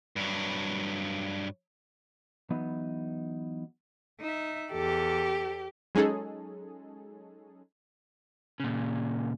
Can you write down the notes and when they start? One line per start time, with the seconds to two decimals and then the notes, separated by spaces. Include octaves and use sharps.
0.16 G2 F#3
2.50 E3 F#3 B3 D#4
4.20 D#4 E5
4.72 E2 G4 A4
5.95 F#3 G#3 C#4 D#4 G#4 A4
8.60 A#2 C#3